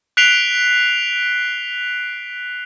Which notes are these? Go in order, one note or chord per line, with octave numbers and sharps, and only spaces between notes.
F#6 B6 C7 D7 F7 G7